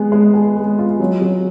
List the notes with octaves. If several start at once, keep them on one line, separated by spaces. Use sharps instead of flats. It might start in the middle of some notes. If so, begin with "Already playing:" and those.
Already playing: G#3 B3 G#4
G#3
G#4
G#3
F4
F#3
F#3